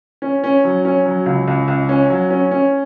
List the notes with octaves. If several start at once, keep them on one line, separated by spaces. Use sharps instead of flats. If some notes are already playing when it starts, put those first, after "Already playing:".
C#4
C#4
F#3
C#4
F#3
C#2
C#2
C#2
C#4
F#3
C#4
C#4